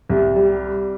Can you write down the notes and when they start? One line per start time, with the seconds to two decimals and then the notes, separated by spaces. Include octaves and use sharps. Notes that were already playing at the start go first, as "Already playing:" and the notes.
0.09 C2
0.36 G3